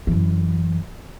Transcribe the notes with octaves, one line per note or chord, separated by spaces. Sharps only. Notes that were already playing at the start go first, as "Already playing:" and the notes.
F#2 E3